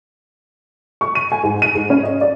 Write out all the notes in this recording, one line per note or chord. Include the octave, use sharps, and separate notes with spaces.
C#6
D#7
G#5
G#2
D#7
G#2
C#4
D#5
D5